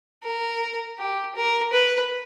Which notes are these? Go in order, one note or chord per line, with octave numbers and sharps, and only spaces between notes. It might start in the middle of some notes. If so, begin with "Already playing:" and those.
A#4
G4
A#4
B4